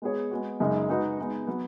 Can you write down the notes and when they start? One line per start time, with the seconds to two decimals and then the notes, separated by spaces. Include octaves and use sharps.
0.02 G#3 B3 G#4 C#5
0.31 G#3 B3 F#4
0.60 F#2 C#3 G#3 D#4
0.89 G#3 D#4 F#4 B4 D#5
1.19 G#3 B3 D#4
1.47 F#3 B3